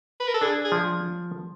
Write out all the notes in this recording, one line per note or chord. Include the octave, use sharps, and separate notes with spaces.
B4
A#4
A4
D4 G#4
G#4
F3